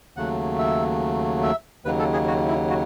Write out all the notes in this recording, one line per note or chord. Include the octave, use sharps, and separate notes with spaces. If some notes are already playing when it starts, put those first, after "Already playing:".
D#2 C#3 F#3 A3 F#5
E5
E5
D#2 C#3 F#3 B4
A4
G#4
F#4
E4
F#4